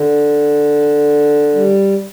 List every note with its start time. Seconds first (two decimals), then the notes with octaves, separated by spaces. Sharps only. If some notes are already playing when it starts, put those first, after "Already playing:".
Already playing: D3
1.54 G3